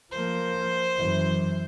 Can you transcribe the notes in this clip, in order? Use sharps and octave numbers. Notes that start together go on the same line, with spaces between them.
F3 A#3 C5
F#2 E3